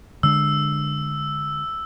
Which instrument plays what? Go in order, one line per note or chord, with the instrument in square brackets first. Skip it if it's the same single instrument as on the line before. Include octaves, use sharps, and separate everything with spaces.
[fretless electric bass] D3 G#3 D4 [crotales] E6